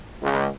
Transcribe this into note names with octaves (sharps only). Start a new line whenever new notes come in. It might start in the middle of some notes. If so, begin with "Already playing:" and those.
C#2